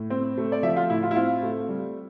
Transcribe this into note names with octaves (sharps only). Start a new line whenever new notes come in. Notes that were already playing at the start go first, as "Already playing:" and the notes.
Already playing: A2
C4
A3
D5
F3 E5
F4
A2 E4
F4
E4
C4 F4
A3
G3